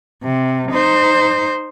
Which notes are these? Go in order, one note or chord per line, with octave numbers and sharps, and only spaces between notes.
C3
D#4 C5